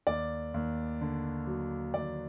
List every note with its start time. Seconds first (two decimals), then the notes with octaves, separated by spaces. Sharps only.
0.07 D#2 D5
0.54 D#2
1.01 D3
1.47 F#3
1.94 D#2 D5